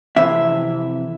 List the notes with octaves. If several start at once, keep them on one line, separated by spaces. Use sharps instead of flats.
F2 C3 E3 C4 E5